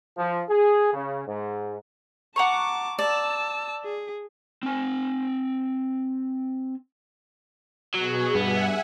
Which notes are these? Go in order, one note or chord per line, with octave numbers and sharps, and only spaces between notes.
F3
G#4
C#3
G#2
F#5 A5 A#5 C#6 D6
D5 A5 E6
G#4
C4 G#5
B2 F#3 G#4
G2 B3 E5 F#5 G#5